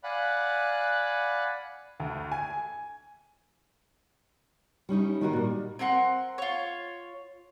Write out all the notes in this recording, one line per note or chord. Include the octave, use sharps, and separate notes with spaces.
D5 F5 F#5 G#5 B5 F#6
D2
G#5
G3 C#4 D#4 E4
D#3 A#3 D#4 F#4 A4 A#4
A#2 G3
C4 A#4 F#5 C6
F4 C#5